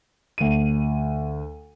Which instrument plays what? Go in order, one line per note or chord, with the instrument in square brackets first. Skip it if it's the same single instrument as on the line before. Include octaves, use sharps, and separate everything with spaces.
[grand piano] D2 D#7